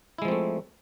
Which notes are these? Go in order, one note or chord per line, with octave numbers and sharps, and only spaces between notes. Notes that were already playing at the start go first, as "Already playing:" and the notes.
F3 G#3 A3 C4 E4